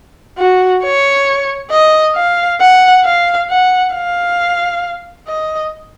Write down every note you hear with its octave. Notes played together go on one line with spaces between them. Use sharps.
F#4
C#5
D#5
F5
F#5
F5
F#5
F5
D#5